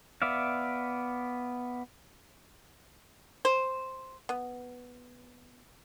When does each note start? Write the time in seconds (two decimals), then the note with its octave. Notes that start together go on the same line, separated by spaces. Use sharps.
0.22 B3 D5 E5 F5
3.45 C5
4.29 B3